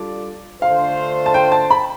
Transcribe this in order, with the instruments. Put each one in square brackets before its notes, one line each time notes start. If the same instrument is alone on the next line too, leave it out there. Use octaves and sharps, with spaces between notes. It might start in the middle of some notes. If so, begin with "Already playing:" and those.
Already playing: [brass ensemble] G3 D4 F4 A4 D5
[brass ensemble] D3 A3 D4 F4 C5 [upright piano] F5
[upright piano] A5
G5
A5
B5